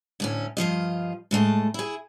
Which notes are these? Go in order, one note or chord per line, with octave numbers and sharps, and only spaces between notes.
D2 A2 C#4
G2 F3 F4 D#5
A2 G#3 A3 A5
E4 G#4